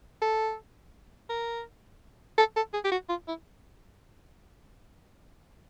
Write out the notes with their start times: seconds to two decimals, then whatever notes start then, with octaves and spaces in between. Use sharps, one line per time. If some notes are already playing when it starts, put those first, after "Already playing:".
0.22 A4
1.29 A#4
2.38 A4
2.56 A4
2.74 G#4
2.84 G4
2.91 F#4
3.09 F4
3.28 E4